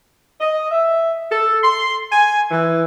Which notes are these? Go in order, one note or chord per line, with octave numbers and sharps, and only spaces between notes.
D#5
E5
A4
C6
G#5
E3